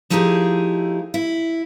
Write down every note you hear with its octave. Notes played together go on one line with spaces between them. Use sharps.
F3 A3 D#4 E4 G4 G#4
E4